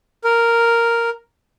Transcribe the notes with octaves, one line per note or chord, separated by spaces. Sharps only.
A#4